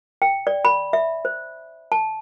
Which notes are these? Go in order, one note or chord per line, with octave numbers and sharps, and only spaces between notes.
G5
D5
B5
E5
C5
A5